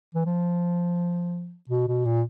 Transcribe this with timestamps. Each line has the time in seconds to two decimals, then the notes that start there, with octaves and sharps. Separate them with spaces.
0.15 E3
0.25 F3
1.69 B2
1.88 B2
2.05 A#2